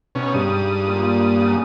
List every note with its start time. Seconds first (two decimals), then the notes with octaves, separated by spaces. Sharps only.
0.15 G#2 B2 C#4 G5
0.34 G2 D#6
0.85 A#2 A#3 C5
1.39 C#3 F#3 B3